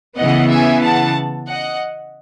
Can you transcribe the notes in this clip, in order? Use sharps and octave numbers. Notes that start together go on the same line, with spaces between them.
C#3 E3 B3 D#5 F#5
E5 G#5
F#5 A5
D#5 F#5